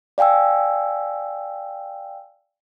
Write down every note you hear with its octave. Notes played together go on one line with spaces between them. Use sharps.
D5 F5 G5 G#5 E6